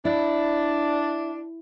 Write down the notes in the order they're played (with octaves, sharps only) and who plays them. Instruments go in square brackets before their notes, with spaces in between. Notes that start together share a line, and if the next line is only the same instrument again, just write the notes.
[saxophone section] D4 [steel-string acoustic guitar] E4